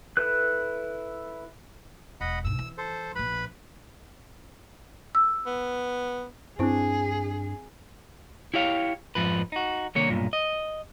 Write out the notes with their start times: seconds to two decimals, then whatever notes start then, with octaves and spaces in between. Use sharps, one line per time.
0.17 E4 A4 B4 F#6
2.21 E1 D#5 F#5 B5
2.44 B1 G2 E6
2.59 E3
2.78 A4 C5
3.15 A#1 F3 B4 B5
5.15 E6
5.46 B3
6.59 G2 C4 D4 E4 G#4 C5
8.54 E4 G4 C#5 F5
9.15 F2 G#2 F3 B4
9.52 D#4 F#4
9.95 C2 D3 D#3 A#3 C#5
10.10 B1 G2 A#2
10.33 D#5